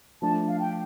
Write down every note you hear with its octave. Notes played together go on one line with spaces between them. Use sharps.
F3 A3 D4 A5
F5
G5